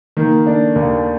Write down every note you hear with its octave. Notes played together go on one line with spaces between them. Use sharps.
D#3 A#3
A3 D4
D#2 A#3